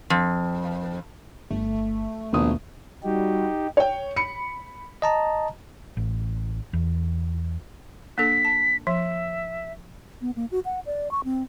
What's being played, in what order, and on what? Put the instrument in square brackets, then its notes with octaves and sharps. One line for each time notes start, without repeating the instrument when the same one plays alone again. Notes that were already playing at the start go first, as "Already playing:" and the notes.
[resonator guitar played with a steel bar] F2
[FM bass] G1 [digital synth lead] A3
[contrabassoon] A#1 [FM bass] D#2 [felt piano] B2 D#6
[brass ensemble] G3 F#4 [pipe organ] D#4 G4
[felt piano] C#5 G5
B5 C#7
[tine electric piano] D#5 A5 A#5
[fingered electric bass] A1
E2
[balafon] A#3 D4 A4 [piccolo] B6
[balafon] A5
[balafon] F3 [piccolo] E5
[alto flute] B3
A#3
F#4
F#5
D5
C#6
C4